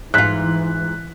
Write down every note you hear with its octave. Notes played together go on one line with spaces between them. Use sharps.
G#2 E3 F4 F#6 B6